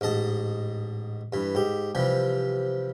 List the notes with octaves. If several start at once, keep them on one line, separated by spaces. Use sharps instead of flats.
A1 G#2 D#5 A5
G2 E3
G#2 G4
C3 E3 F3 G3